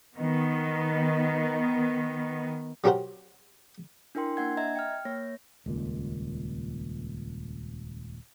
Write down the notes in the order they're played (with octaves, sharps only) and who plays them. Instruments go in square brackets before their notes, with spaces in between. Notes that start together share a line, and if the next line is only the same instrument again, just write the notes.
[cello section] D#3 B3
[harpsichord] F#3 C#4 G4 A#4 C5 F#5
[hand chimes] D4 E4 A#4 G5 C6
A#3 D4 F#5 G#6
D#5 E5 A#5 G#6
G5 F6
A#3 C#5 A#6
[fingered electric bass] D#1 C#2 A#2